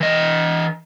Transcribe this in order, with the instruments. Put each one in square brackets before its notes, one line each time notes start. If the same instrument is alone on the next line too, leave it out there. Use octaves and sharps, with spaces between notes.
[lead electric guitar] E3 D#5